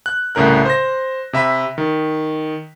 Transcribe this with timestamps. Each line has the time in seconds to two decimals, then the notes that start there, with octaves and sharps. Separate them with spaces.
0.06 F#6
0.35 C2 A2 C#3 A#4 F#6
0.65 C5 A#6
1.33 C3 E5 B5 B6
1.78 D#3